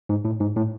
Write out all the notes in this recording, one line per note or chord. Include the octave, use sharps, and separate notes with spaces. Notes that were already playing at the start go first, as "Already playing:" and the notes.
G#2
A2
G#2
A2